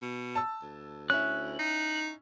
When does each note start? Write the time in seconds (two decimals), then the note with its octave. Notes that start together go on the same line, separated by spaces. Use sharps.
0.02 B2
0.35 A5 E6
0.62 D2
1.10 C#4 E4 F#6
1.59 D#4